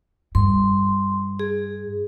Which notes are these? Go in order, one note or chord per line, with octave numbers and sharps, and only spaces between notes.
G2 C6
G#4